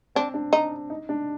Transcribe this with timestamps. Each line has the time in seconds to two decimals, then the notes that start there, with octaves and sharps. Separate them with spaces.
0.15 C4 D4
0.34 D4
0.53 D#4
0.90 D#4
1.09 D4